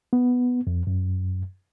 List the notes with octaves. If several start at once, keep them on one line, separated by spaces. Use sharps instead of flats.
B3
F2
F#2